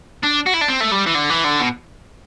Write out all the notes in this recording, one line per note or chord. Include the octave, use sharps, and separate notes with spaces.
D4
F#4
E4
D4
C4
A3
G3
E3
D3
E3
D3
B2